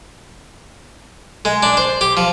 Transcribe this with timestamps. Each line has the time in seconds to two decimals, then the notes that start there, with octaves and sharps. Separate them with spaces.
1.45 G#3
1.63 D4
1.77 C5
2.01 G4
2.17 F3